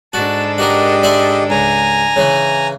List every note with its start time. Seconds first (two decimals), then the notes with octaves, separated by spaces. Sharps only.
0.13 G#2 D4 F#4 A4 A5
0.58 F#4 G4 A#4 D#5
1.03 D5 E5 C6
1.50 C#2 G#5 A#5
2.16 C#3 E3